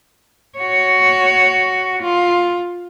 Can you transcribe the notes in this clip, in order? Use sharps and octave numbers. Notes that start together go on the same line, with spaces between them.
F#4 C#5
F4